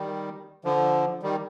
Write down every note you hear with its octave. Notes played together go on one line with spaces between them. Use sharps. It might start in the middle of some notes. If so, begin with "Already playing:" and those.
Already playing: D#3 G3
D3 F3
D#3 G3